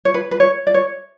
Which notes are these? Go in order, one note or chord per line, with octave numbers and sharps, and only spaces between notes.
C#5
B4
B4
C#5
D5
C#5